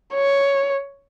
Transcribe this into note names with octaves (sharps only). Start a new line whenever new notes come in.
C#5